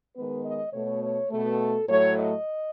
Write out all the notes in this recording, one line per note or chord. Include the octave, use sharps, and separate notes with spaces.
D#3 G#3 B3 B4
D#5
B2 A3 C#5
C#5
B2 A3 A4
A2 F#3 A3 C#5
D#5